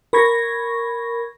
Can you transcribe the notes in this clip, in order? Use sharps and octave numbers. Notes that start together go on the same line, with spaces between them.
A#4 B5 C#6 G#6 A#6